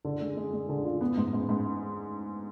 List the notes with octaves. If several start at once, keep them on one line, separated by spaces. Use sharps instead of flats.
D3
G#3
G#3
G#3
D3
F4
B3
G#2
G#2
G#2